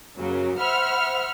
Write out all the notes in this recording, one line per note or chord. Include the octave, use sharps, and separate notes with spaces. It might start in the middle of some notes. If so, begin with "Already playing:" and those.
F#2 C#3 F#3 A#3
C5 E5 F#5 B5 F6